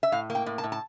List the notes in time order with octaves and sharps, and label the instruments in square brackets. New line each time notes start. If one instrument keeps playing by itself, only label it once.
[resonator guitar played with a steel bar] E5
A2 F5
A#3
G5
A2
A5
A2
A5